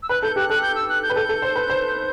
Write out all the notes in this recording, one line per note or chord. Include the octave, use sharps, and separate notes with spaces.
E6
B4 F#6
A4 G6
G4 F#6
A4 F#6
G6
E6
F#6
G6
B4
A4 G6
A4
C5
B4
C5